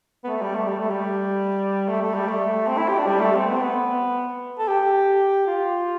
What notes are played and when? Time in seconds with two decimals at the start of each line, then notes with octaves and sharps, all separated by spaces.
0.24 B3
0.28 A3
0.42 G3
0.56 A3
0.69 G3
0.80 A3
0.90 G3
1.89 A3
2.02 A3
2.15 G3
2.28 A3
2.67 C4
2.78 E4
2.88 G4
2.99 D4
3.07 G3
3.21 A3
3.35 C4
3.48 B3
3.55 C4
3.61 B3
4.59 A4
4.68 G4
5.47 F4